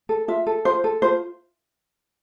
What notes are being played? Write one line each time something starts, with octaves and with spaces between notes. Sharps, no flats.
A4
F4 E5
A4
F4 C5
A4
F4 C5